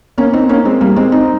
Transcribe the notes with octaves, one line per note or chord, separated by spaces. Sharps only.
A#3 C#4
C4 D#4
A#3 C#4
G#3 C4
G3 A#3
G#3 C4
C4 D#4